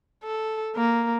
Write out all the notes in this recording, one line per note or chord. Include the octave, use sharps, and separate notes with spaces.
A4
A#3